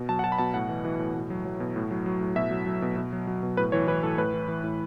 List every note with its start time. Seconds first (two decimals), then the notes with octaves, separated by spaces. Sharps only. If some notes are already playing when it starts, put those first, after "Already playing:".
Already playing: B2
0.09 F#3 A5
0.19 F#5
0.24 F#3 A5
0.32 B5
0.38 B2 A5
0.54 A2 F#5
0.69 E3
0.85 E3
0.99 A2
1.15 B2
1.30 F#3
1.45 F#3
1.60 B2
1.76 A2
1.91 F#3
2.06 F#3
2.21 A2
2.36 B2 E5
2.51 F#3
2.66 F#3
2.82 B2
2.97 B2
3.13 F#3
3.27 F#3
3.43 B2
3.57 A2 B4
3.72 E3 C#5
3.87 E3 B4
4.03 A2 A4
4.18 A2 B4
4.34 E3
4.48 E3
4.64 A2